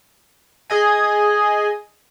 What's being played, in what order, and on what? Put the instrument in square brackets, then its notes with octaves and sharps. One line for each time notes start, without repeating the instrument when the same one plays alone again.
[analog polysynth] G#4 D#5 G#5